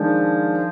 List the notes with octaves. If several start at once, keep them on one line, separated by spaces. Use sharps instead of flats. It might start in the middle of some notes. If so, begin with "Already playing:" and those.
Already playing: D#3 F3 G#3 D4